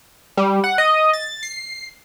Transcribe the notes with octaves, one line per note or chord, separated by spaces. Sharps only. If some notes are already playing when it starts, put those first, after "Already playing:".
G3
F#5
D#5
A6
C7